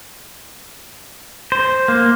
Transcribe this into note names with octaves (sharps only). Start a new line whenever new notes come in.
C5
A#3